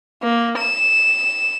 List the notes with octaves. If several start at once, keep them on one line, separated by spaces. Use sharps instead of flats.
A#3
E7